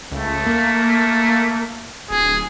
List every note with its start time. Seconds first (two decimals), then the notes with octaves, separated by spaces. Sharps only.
0.11 C#2 A3
0.47 A#3
2.10 D1 G#4